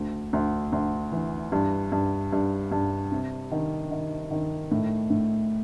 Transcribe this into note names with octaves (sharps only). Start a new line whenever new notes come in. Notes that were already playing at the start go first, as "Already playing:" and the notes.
Already playing: D2
D2
D2
E3
G2
G2
G2
G2
C3
D#3
D#3
D#3
A2
A2